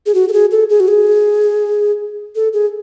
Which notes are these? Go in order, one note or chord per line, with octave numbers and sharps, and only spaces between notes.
G#4
F#4
A4
G#4
A4
G#4
F#4
G#4
A4
G#4